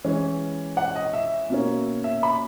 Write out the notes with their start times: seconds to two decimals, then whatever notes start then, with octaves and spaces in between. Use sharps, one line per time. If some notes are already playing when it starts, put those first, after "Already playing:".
0.04 E3 G#3 C#4
0.77 F#5
0.96 D#5
1.13 E5
1.50 B2 A#3 C#4
2.04 E5
2.23 B5